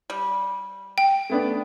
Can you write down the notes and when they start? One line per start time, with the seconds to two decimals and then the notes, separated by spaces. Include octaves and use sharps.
0.10 G3
0.98 G5
1.30 A3 B3 D4